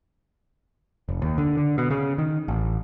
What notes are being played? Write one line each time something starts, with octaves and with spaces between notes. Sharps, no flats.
F1
D#2
D3
D3
B2
C#3
D#3
A1